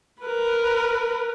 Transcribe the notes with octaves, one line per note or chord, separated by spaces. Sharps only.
A#4 B4